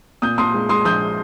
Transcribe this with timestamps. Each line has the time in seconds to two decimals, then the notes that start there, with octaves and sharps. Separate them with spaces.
0.22 A#2 D#6 G6
0.38 A#2 C6 D#6
0.54 G#3
0.69 G#3 C6 D#6
0.85 A#1 D#6 G6